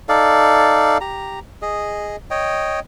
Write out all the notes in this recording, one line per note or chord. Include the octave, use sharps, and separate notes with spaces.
D#4 A4 D5 F5
G4 A#5
G#4 D#5
C#5 D#5 G5